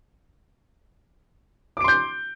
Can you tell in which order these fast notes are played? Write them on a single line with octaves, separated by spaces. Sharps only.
D6 D7 C6 G6